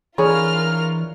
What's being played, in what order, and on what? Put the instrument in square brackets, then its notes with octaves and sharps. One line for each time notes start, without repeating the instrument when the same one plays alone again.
[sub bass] E3 [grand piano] D4 B4 C#5 [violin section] F4 A#4 F6 [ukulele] G#4